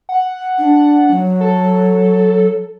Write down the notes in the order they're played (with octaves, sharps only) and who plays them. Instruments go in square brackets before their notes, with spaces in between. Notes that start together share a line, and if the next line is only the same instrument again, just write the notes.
[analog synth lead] F#5
[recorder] D4
F#3
[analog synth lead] A4